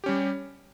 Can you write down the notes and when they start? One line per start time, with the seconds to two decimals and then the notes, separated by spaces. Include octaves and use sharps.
0.04 G4
0.06 C#4
0.09 G3